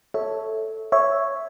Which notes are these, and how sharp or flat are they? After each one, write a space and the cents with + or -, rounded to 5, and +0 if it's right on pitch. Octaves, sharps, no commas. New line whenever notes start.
A4 +0 C#5 +0 E5 -20
C#5 +0 E5 +0